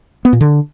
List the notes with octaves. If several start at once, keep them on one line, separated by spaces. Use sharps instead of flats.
B3
A#2
D3